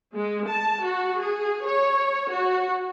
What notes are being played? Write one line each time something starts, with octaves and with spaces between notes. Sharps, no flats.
G#3
A5
F#4
G#4
C#5
F#4